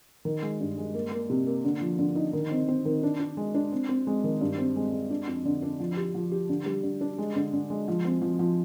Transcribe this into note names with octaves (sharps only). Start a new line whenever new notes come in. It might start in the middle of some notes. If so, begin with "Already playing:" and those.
D#3
G#3
G2
G#3
A#3
A#3
C3
A#3
D3
F3
D3
D#4
D#3
C4
C4
D#3
D4
D4
G#3
D4
C4
C4
G#3
D#3
G2
C4
G#3
G#3
D4
F2
D3
D4
F3
G4
F3
G4
D3
G3
D3
D4
G#3
D3
D3
G#3
F3
C4
F3
F3